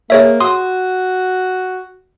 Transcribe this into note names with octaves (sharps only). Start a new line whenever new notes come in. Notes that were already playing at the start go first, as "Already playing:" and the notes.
A#3 G#4 C#5 E5
F#4 C6 D#6